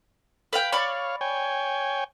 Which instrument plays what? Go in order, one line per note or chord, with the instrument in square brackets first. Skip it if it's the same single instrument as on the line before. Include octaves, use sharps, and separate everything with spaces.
[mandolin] B4 F5 G5
[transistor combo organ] C#5 F5 [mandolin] D5 B5 C#6
[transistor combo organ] C#5 G5 G#5